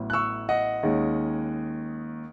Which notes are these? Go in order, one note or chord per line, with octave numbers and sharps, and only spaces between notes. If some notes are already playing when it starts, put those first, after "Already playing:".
Already playing: A1 A2 F#3 B3
F#6
C#6 E6
D#5 F#5
D#2 D#3 G#3 C#4